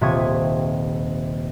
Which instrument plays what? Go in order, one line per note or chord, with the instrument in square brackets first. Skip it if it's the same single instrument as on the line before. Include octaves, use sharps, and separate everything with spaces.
[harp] D#1 C3 E5 C#6 D#6 G#6